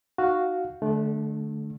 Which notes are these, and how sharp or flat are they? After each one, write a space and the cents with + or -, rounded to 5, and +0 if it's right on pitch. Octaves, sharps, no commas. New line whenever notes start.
D#4 +0 F#4 +0 F5 +0
D3 +15 A3 -25 D4 +0